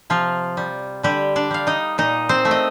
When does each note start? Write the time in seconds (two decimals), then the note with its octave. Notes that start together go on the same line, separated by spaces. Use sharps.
0.10 C3 F3 F4
0.57 G3
1.03 D3 G3 G4
1.36 D4 D5
1.51 G3 F5
1.67 D#4 D#5
1.98 A#2 D#4 D#5
2.29 C4 C5
2.45 A3
2.51 D#5